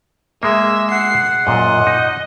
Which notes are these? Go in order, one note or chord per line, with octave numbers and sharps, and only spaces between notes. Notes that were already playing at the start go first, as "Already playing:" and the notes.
G#3 A#3 E5
F#5 C7
F#2 A#2 D#5
D#4